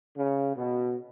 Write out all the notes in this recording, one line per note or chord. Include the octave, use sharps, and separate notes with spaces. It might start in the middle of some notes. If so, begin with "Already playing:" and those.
C#3
B2